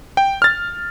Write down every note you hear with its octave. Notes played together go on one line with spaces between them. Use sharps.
G5
F6 A6